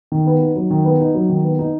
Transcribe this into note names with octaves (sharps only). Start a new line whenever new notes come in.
D#3
B3
D#4
F#3
D#3
B3
D#4
F#3
D#3
B3
D#4